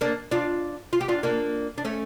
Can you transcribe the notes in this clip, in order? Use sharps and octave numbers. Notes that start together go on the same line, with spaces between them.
A#3 D4
D4 F4
F4
G4
D4 F4
A#3 D4
D4
A3 C#4